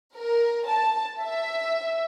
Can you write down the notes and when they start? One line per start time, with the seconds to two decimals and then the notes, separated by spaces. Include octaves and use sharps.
0.16 A#4
0.66 A5
1.21 E5